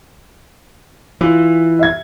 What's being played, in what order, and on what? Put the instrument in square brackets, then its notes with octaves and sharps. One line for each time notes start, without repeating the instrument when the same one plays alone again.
[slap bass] E3 [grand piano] F4
[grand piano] E5 G#6